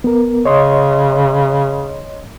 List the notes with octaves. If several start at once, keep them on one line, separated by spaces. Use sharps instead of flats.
B3 A#4
C#3 C#5 D#5 C6